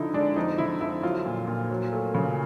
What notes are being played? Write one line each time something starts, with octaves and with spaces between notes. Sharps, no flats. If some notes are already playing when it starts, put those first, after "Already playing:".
Already playing: D3 F3 D#4 E4
G#3 D4
F2 D#4
D3 E4
F2 E4
F#3 F4
A#2
A#2
F#3
A3
C#3